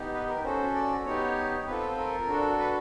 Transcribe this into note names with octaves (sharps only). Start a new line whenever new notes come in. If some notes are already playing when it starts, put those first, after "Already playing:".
Already playing: B3 D#4 G4
B4
A#4
C#4 F#4 A4 C5
D5
B3 D#4 G4 C#5
C4 F4 A4 B4
A#4
D4 F#4 A4
B4